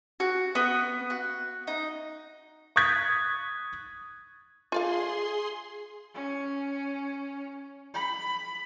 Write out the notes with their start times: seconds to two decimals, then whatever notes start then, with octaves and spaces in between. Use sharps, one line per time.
0.20 F#4
0.55 B3
1.10 F#4
1.67 D#4
2.76 C#6 D#6 F#6 G#6 A6 B6
4.72 F4 G#4 D5 F5 C6
6.15 C#4
7.94 B5